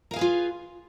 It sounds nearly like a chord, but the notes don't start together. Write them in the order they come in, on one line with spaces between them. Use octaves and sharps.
A#4 F5 G#4 B4 F4